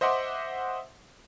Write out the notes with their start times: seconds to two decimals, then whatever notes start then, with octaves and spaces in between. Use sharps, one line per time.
0.01 C5 D#5 E5 F#5 C6 D6